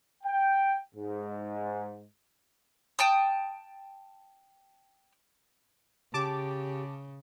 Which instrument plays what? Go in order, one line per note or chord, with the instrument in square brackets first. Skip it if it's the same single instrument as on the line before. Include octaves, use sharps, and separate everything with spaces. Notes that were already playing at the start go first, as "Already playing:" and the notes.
[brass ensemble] G5
G#2
[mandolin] G5 A5 D#6
[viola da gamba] C#3 [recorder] G4 [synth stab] A5 D6